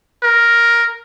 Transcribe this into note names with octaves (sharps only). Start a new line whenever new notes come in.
A#4